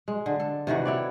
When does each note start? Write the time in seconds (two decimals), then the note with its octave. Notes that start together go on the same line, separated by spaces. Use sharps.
0.08 G#3
0.26 D3
0.40 A4
0.67 C3 D#3 E3 F#4
0.85 E4 C#5 D5